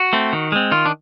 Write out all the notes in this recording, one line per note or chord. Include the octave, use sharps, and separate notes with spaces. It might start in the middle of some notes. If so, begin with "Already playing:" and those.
Already playing: F#4
A3 C4
D#3
G#3 C4
D#3 F4
D4